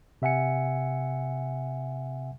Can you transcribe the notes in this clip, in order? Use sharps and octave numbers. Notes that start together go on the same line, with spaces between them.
C3 E5 F#5 G#5 C#7